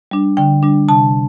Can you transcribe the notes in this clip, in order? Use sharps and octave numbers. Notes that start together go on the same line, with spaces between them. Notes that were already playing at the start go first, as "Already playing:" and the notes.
G3 D4
D3 G5
G3 D4
C3 A5